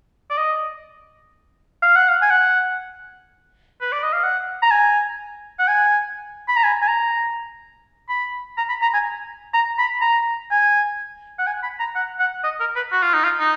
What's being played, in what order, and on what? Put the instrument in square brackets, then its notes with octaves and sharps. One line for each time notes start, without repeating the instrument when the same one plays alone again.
[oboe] D5
D#5
F5
F#5
F5
G#5
F#5
B4
D5
D#5
F5
F#5
A#5
G#5
F#5
G#5
B5
A#5
G#5
G#5
A#5
B5
A#5
B5
A#5
G#5
A#5
B5
A#5
G#5
F#5
G#5
B5
A#5
F#5
F#5
D#5
A#4
B4
F#4
F4
D#4
F4
D#4